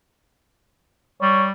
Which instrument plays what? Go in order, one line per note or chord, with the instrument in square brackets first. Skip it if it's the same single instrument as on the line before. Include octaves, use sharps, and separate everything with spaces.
[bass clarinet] G3 [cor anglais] C#5